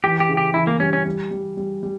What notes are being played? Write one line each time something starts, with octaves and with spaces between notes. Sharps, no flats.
E3 G4
G4
C#3
G4
E3 E4
A#3
G3 C#4
C#4
G3
G3
G3
G3